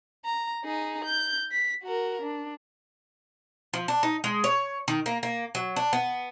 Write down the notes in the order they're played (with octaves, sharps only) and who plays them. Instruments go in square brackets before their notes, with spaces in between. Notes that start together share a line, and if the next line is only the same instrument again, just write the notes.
[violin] A#5
D#4 G#4
G6
B6
F#4 A#4
D4
[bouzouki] F3
D4
D#4
G#3
C#5
D#3
A#3
A#3
F#3
D4
B3